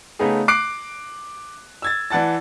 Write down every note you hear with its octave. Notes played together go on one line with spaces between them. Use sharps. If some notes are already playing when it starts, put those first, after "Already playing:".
C#3 A3 B3 D#4 G#4
D6 F#6 C7 D7
E6 G#6 A6
E3 D5 F#5 A5 A6